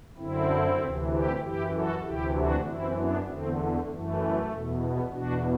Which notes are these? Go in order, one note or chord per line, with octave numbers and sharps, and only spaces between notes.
F#2 D3 C4 E4
D2 C3 E3
E4 G4
F#2 E3 E4 G4
F#4 A4
D2 C3 E3 E4 G4
D4 F#4
F#2 E3 C4 E4
B3 D4
E2 D3 A3 C4
A3
F#2 E3 A3
E2 B2
B3
E2 B2 D4 F#4